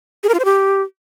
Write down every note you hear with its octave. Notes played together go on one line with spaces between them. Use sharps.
G#4
A#4
F4
C5
G4